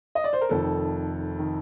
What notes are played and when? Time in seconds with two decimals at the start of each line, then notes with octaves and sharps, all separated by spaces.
0.15 D#5
0.24 D5
0.33 C5
0.41 A#4
0.49 F1 F2 D#3 A4
1.39 D#3